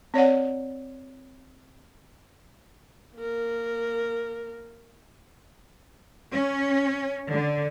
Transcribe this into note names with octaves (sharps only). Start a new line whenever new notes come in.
C4 C#5 D5 F#5
A#3 A#4
C#4
D3